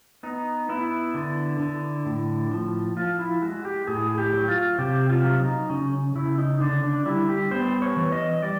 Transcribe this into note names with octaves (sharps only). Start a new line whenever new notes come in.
B3 D#4
B3 E4
D3
D3
A2
F3
F3 F4
E4
G#3 F#4
G4
A2 G#4
G4
F#3
F4
C3 G4
F4
F#3
D#4
C#3 C#4
C#3 E4
D#4
D3 D4
D4
G3 E4
G4
B3 C5
C#5
E3
D#5
G3 D5